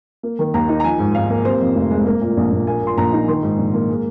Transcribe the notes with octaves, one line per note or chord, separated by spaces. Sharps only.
A#3
D#3
D#2 A#5
D#4
A#5
F3 G#5
G#2
G#1 F5
A#3
C3 C5
F2
F1
G#3
A#3
A#2
A#1
A#1
A#3 G#5
A#2 C6
A#1 A#5
D#4
D#3 C6
G#2
A#1
A#3
G#3